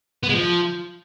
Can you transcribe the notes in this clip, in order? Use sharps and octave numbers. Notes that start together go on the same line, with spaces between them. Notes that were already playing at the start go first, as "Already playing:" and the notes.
B3
G#3
F3